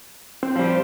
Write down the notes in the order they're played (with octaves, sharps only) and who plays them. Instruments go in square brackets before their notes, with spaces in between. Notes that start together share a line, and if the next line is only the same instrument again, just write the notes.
[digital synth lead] C4
[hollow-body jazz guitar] F3 G3
[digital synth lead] C5